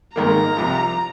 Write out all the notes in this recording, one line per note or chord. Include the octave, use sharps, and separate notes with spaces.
G#1 G#2 D#3 A#3 A#5
C2 C3 F3